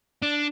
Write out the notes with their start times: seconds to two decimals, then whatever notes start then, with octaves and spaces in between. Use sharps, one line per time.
0.22 D4